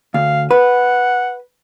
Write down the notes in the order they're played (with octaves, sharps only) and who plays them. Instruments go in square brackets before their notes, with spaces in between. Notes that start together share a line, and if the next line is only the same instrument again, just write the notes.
[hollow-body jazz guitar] D2 [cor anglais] F5
[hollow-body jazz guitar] B4 [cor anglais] F#5